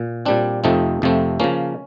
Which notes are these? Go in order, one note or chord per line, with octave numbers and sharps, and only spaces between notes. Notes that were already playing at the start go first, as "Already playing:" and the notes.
Already playing: A#2
A#2 G3 C4 D4
F2 C3 F3 A3 C4 D#4
F2 C3 F3 A3 C4
C#3 F3 A#3 C#4